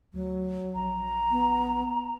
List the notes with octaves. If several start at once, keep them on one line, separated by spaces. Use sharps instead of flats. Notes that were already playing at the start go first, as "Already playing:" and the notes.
D2 F#3
A#1 A#5
B3